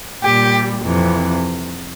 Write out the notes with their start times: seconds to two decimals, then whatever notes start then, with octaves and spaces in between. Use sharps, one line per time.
0.23 A#2 G3 G4
0.84 F2 C3 E3